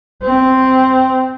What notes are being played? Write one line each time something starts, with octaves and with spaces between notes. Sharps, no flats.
C4